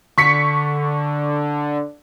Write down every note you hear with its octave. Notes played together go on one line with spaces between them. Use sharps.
D3 C#6 B6 C#7